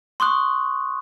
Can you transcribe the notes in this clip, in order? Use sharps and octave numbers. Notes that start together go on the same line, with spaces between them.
C6 C#6 D#6 F#6